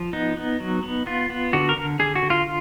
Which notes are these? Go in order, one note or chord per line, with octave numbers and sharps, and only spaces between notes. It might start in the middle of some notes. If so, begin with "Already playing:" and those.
Already playing: F3
B3 D#4
B3
F#3
B3
B3 F4
B3
D3 F#4
A#4
D3
D3 G#4
F#4
D3
F4